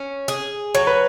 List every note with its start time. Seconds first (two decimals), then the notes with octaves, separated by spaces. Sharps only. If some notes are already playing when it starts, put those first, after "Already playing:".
Already playing: C#4
0.28 G#4
0.75 F#3 C#5
0.87 B4